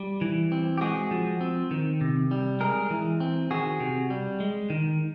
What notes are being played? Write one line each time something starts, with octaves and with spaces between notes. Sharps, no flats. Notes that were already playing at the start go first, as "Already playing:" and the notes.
Already playing: G3
E3
C4
G4
G#3 F#4 G#4
F3
C4
D#3
C3
G3
G#3 G#4 A#4
E3
C4
D#3 F#4 G#4
C3
G3
G#3
D#3